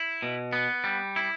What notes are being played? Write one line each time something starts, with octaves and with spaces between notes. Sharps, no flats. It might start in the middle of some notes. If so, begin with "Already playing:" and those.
Already playing: E4
B2
B3
G3
E4